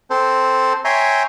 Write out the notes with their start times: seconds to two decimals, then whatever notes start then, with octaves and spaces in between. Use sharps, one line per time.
0.10 C4 A4 C5
0.85 C#5 E5 G5 G#5 A#5 C6